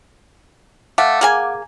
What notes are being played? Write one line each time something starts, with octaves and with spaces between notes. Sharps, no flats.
A3 F5 F#5 D6
A#3 G#4 G#5